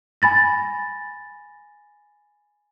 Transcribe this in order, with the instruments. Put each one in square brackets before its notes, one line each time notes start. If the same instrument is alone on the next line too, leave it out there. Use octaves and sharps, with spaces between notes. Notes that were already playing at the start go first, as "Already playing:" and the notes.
[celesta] G#5 B5 A6 A#6